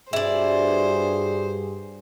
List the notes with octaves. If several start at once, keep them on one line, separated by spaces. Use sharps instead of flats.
G2 G3 E4 F#4 G#4 C5 D5